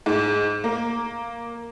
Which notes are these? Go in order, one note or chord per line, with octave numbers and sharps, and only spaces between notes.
G#2
A#3